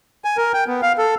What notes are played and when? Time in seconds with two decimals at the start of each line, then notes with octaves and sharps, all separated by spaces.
0.24 G#5
0.37 A#4
0.54 G5
0.67 B3
0.82 F5
0.98 A4